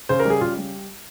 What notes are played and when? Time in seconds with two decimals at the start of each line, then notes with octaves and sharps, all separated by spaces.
0.09 C#3 C5
0.19 A#4
0.25 G3
0.30 G#4
0.41 C#3 F4
0.57 G3